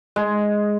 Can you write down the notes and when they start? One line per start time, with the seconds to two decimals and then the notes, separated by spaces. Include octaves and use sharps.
0.16 G#3